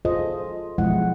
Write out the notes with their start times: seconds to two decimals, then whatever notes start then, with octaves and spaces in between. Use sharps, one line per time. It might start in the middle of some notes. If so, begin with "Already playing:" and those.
0.05 F4 G#4 A4 C5 D#5
0.78 B2 F3 F#3 G#3 E4 F#5